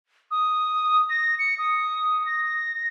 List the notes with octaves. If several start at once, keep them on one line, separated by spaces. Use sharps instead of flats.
D#6
A#6
C#7
D#6
A#6